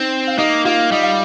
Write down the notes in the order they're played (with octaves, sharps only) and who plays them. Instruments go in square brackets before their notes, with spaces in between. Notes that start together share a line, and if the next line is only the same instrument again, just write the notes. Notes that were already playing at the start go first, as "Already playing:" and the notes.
Already playing: [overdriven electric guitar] C4 [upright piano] D#4
[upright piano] F5
[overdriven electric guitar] A#3 [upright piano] D#4 D#5
[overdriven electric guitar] A#3 [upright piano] F4 F5
[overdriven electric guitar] G3 [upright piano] D#5
[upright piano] F5